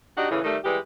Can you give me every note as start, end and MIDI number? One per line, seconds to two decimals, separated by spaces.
0.17 0.28 62
0.17 0.28 63
0.17 0.28 66
0.17 0.28 67
0.17 0.28 74
0.31 0.40 45
0.31 0.40 49
0.31 0.40 52
0.44 0.58 51
0.44 0.58 55
0.44 0.58 57
0.65 0.78 52
0.65 0.78 55
0.65 0.78 56
0.65 0.78 67
0.65 0.78 71